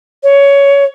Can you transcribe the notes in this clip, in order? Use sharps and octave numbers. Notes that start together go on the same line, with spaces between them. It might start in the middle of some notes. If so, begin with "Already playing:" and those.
C#5